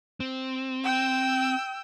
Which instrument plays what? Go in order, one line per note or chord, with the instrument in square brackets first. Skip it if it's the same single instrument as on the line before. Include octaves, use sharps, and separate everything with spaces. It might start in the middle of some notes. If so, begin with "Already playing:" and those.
[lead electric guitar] C4
[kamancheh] G5 E6